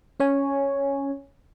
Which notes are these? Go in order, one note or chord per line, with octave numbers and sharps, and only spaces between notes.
C#4 C#5 G#5